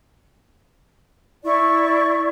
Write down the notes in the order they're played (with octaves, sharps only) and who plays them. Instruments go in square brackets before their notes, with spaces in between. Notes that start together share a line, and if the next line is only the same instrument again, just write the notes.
[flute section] E4 D5 C#6